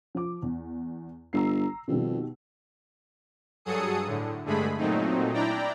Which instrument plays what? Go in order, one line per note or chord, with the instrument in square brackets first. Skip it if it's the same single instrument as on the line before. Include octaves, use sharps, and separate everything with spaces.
[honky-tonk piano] F3 D6
E2
[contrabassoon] G1 [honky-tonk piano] A#5 E6 C7
[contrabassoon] F2 [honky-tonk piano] B2 D#3 G3
[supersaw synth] G2 F#3 G#4 A4 D#6 C#7
A2 D3
G2 D3 G#3 A3 G#4 B5
A#2 F#3 A3 C4 D#4
D4 E4 D5 G5 A#5